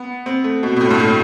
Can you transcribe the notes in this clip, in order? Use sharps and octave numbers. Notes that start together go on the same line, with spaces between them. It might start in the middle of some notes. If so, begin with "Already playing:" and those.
Already playing: B3
C4
A3
B2
B2
A2
G2
A2